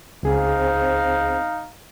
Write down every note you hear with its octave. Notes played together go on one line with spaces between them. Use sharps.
C#2 C4 D#4 G#4 F5